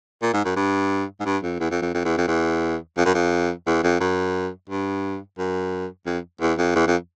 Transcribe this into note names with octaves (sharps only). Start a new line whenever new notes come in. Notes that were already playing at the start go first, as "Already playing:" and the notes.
A#2
G#2
F#2
G2
G#2
G2
F2
E2
F2
F2
F2
E2
F2
E2
F2
F#2
F2
E2
F2
F#2
G2
F#2
F2
E2
F2
E2
F2